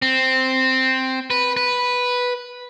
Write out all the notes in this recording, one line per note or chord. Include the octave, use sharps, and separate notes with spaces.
C4
B4
B4